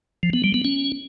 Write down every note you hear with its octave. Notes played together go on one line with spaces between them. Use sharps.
F3
B3
G3
B3
C#4